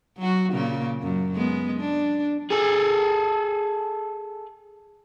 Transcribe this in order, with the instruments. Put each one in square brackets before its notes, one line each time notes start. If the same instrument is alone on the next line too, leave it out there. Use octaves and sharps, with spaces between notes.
[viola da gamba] F#3 F#4
A#2 C#3 A#3
F#2
G#3 B3
D4
[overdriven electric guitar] G#4 A4